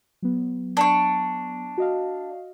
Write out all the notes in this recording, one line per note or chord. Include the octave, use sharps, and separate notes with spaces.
F#3 B3
D4 C#6
F#4 D#5 F5